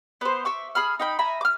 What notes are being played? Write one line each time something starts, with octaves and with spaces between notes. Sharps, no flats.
B3 C5
E5 C#6 D6
G#4 B5 F6
D#4 G5 B5
E5 G#5 A#5 B5
D6 F6